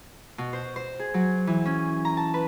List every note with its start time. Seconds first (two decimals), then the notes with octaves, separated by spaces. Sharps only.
0.38 B2
0.53 C5
0.76 C5
0.99 G#4
1.14 F#3
1.47 E3
1.65 C#4
2.05 A#5
2.17 A5
2.34 B4